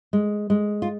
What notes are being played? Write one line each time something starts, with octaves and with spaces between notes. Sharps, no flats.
G#3
G#3
F4